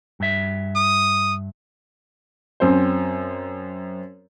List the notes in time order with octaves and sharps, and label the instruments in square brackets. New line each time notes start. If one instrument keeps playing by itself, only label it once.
[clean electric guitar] G2 E5
[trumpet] D#6
[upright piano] F#2 C4 C5